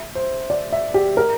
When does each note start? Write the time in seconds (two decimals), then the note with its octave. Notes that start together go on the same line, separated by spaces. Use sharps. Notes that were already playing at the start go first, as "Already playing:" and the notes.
Already playing: E5
0.15 C5
0.50 D5
0.72 E5
0.94 G4
1.17 A#4